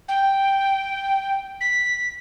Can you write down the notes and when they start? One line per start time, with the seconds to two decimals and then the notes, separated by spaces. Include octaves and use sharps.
0.08 G5
1.61 B6